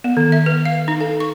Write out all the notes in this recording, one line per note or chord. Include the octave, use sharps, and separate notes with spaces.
B3
D#3
E5
B4
F5
D#4
A4
C#6